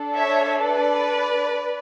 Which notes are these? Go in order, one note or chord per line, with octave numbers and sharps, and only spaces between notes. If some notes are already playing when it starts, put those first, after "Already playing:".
Already playing: D4 A4
C#5 E5
B4 D5